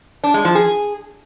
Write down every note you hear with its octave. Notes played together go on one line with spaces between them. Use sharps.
D4
G#3
F3
G#4